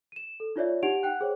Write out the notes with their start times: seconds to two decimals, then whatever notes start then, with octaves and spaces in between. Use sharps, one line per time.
0.12 D#7 E7
0.40 A4
0.56 D#4 F4 C#5 D5 E5
0.83 D#4 G4 F#5 D7 F7
1.03 F#5 G5 F#6
1.21 G#4 C5 C#5